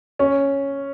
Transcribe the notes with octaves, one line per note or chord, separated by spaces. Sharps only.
C#4